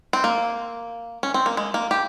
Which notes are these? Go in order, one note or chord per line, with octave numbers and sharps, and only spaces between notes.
C4
A#3
C#4
C4
A#3
G#3
A#3
G4